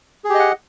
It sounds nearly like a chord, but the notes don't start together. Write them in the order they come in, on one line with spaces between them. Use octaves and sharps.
G#4 G4 D#5 F#5